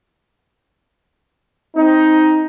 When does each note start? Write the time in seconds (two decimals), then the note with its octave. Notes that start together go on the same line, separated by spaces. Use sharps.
1.76 C4 D#4